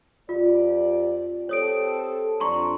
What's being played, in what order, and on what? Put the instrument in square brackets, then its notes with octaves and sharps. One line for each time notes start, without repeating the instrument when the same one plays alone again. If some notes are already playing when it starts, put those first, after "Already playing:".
[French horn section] F2 G4 D5 [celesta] F4
[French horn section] C4 G4 A4 [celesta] C#5 D#6 D7
[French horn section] F2 D4 [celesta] A#5 C6 C#6